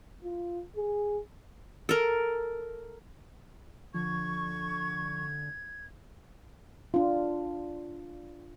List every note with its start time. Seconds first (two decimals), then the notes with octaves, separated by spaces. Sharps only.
0.24 F4
0.76 G#4
1.89 A4 A#4
3.94 D3 F3 C#6 G#6
6.94 D4 F4